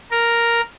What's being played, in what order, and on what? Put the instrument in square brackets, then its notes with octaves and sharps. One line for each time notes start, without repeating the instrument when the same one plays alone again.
[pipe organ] A#4